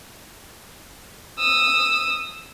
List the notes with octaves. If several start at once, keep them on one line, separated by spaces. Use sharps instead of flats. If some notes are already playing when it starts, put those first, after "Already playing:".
D#6 E6